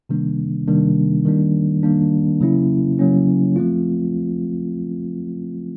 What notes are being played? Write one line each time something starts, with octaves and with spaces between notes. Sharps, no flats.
C3 D#3 G3 A#3 D4
C3 D#3 G3 A#3 D4
D#3 G3 A#3 D4
D#3 G3 A#3 D4
C#3 F#3 A#3 C#4 E4
C#3 F#3 A#3 C#4 E4
F3 A3 C4 F4